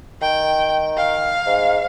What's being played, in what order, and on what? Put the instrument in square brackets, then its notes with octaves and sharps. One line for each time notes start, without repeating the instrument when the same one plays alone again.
[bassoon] D#3 [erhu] G5
[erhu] F5
[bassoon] G#2